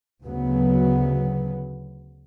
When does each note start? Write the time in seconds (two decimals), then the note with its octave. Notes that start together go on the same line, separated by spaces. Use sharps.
0.24 D2 C#3 F#3 B3